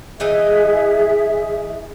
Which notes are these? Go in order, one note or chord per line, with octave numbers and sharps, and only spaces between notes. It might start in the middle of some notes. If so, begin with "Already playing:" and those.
E3 D#4 G#4 D#5 E5